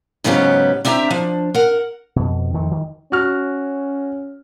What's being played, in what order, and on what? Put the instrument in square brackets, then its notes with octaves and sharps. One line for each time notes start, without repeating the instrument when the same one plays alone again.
[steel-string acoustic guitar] G#2 C#3 F#3 B3 C#4 G4
C4 D4 G4 E5 A5 A#5
F3 D4
A#4 F#5
[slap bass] F2 B2
F2 D#3 F3 A3
D#3
[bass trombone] C#4 [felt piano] F#4 F6